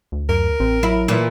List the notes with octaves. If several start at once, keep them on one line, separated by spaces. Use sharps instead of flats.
D2
F#2 A#4
A1 C4
F#3 E4
A#2 E3